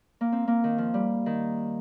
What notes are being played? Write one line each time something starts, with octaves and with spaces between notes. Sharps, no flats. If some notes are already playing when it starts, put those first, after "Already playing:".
A#3
C4
A#3
D#3
F3
G3
D#3